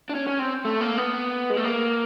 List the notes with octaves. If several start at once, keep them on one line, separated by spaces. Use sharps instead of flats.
D4
C#4
C#4
C4
A3
A#3
B3
G#3
A3
A#3